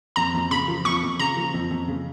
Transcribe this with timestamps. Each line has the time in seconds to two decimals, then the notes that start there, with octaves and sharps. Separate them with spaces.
0.16 F2 A#5
0.34 F2
0.51 C#3 B5
0.68 F3
0.85 F2 C#6
1.03 F2
1.19 C#3 A#5
1.37 F3
1.54 F2
1.71 F2
1.88 C#3